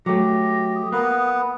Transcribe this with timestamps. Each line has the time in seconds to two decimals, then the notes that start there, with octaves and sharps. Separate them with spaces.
0.06 F#3 A3 G4 A#6
0.75 D#6
0.92 A#3 B3 B4